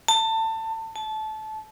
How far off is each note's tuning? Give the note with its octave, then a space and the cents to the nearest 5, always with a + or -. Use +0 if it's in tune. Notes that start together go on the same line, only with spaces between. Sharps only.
A5 +25
A5 -20